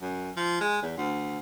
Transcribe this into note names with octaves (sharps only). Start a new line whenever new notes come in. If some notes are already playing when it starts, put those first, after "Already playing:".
F#2
F3
G#3
E2
D2